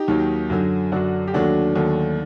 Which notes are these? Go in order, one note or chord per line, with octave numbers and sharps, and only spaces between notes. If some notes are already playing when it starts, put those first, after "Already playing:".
Already playing: D#4 G4
D#2 D#3 F#3
F#2 D3 F#3
F#2 D3 F#3 D4 F#4
G4
D#2 D3 F#3 A3 D4 F#4
D#2 D3 F#3 A3